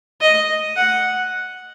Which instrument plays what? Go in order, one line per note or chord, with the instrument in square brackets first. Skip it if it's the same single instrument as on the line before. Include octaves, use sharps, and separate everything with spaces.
[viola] D#5
F#5